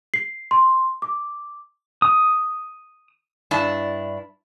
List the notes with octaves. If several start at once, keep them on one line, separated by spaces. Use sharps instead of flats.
C7
C6
D6
D#6
G2 D4 E4 A5